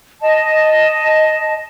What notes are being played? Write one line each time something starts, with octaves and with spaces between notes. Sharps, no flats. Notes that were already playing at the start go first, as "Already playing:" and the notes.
D#5 A5